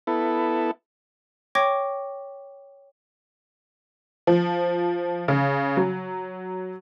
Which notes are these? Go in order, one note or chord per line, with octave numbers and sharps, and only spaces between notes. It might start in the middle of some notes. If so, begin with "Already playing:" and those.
B3 E4 A4
C#5 G5 C#6 D6 G#6 A#6
F3
C#3
F#3